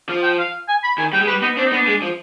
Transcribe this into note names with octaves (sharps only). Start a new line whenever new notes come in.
F3 F5
G5
F5
G#5
B5
D#3 G#5
G3 G5
G#3
G3 B4
B3 D#4
C4 D4
D#4
B3 D4
G#3
F3